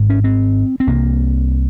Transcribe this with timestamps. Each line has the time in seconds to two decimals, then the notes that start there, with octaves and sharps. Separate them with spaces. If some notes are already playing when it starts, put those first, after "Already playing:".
Already playing: G#1 G#2
0.10 C#4
0.24 C4
0.80 C4
0.87 C2 C3 A#3